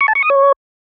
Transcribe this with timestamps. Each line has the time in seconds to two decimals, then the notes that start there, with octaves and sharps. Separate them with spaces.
0.01 C#6
0.08 A5
0.15 C#6
0.23 D#6
0.30 C#5